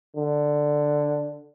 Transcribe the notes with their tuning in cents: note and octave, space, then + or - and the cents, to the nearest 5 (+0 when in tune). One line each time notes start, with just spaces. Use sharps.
D3 +5